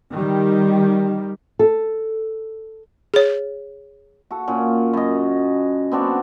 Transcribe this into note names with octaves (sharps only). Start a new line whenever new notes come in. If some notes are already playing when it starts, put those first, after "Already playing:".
D#3 G3
A4
G#4 C#5
F#4 A4
A#2 C#4
F#2 D#5
B3 C4 D4 F#4